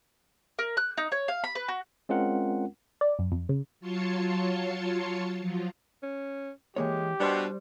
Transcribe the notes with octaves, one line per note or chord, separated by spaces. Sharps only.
A#4
F#6
D#4
C#5
F5
B5
B4
F#4
G#3 C4 C#4 F4 A#4 F#5
D5
F#2
F2
C#3
F#3 F4 C#5 A5 C6 C#7
F3 F#3 F4
C#4
E3 G#3 A#3 G4 C#5
B2 G3 D4 C5 C6